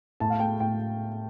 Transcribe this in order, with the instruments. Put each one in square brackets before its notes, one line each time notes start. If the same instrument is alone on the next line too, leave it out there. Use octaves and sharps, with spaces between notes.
[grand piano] A2 A5
F5
A3 G5
A2 G5